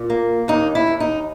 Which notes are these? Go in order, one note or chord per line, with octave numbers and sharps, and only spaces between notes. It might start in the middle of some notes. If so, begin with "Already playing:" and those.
Already playing: A#2
A#3
D#2 D#4
E4
D#2
D#4